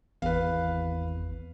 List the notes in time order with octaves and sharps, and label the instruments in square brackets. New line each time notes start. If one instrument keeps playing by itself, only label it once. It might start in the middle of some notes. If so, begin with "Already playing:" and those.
[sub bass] G#1 [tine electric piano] E2 [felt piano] B4 F5